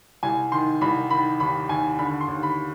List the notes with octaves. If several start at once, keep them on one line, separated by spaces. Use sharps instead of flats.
C2 G#5
D#3 C6
C2 B5
D#3 B5
D#2 B5
D#2 G#5
D3 B5
C6
D#2
B5